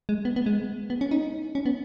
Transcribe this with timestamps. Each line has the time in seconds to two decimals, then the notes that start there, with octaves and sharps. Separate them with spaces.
0.09 G#3
0.25 B3
0.36 B3
0.46 G#3
0.90 B3
1.01 C#4
1.11 D#4
1.55 C#4
1.66 B3